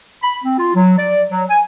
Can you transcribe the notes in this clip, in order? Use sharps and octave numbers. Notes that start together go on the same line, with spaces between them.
B5
C4
F4
F#3
D5
F#3
G#5